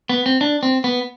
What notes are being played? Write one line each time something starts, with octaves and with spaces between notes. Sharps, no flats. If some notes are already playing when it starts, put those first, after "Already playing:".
B3
C4
D4
C4
B3